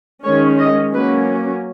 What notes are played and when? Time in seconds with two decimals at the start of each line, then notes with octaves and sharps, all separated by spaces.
0.23 D#3 G#3 C#4 C#5
0.58 D#5
0.93 F#3 A#3 C#4 B4